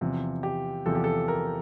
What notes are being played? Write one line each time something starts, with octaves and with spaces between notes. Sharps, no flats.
E2 C3 F3
G4
E2 C3 F3 A4
G4
A4
A#4